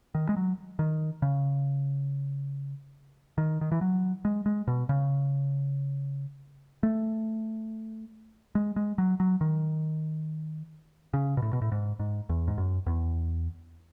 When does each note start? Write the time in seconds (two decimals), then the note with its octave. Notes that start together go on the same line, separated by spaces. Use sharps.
0.15 D#3
0.29 G#3
0.36 F#3
0.79 D#3
1.22 C#3
3.38 D#3
3.61 D#3
3.72 E3
3.81 F#3
4.25 G#3
4.46 G#3
4.68 B2
4.89 C#3
6.83 A3
8.55 G#3
8.76 G#3
8.98 F#3
9.20 F#3
9.41 D#3
11.14 C#3
11.37 B2
11.42 A2
11.53 B2
11.62 A2
11.72 G#2
11.99 G#2
12.29 E2
12.48 G#2
12.58 F#2
12.86 E2